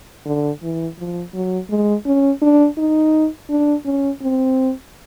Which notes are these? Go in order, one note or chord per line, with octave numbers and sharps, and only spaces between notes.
D3
E3
F3
F#3
G#3
C#4
D4
D#4
D4
C#4
C4